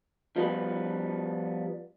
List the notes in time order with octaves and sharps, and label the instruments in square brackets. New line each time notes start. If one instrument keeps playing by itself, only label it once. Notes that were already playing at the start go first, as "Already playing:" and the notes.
[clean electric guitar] F3 G3 B3 B4